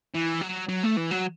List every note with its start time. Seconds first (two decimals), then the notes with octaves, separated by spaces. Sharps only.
0.15 E3
0.41 F#3
0.69 F#3
0.83 A3
0.97 E3
1.11 F#3